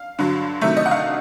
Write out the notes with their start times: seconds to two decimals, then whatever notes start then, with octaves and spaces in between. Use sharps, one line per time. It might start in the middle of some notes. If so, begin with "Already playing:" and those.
Already playing: F5
0.19 G2 D3 F#3
0.61 C3 D#3 F#3 A3 E5
0.77 D#5
0.86 F#5
0.91 F5